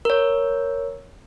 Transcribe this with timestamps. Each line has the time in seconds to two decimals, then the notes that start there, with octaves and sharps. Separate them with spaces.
0.05 A#4 C#5